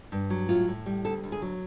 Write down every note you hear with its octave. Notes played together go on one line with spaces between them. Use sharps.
G2
F#3
A2 F4
A2
G3
D2 A4
D2
G#4
F#3